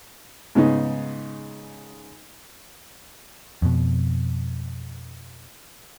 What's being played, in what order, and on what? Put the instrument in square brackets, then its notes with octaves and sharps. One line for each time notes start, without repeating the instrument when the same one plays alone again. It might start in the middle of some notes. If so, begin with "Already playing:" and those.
[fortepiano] G#2 C#3 B3 D#4
[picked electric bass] F2 B2